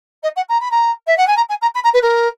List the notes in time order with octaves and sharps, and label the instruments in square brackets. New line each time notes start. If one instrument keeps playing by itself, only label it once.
[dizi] D#5
F#5
A#5
B5
A#5
E5
F#5
G#5
A#5
G#5
A#5
B5
A#5
B4
A#4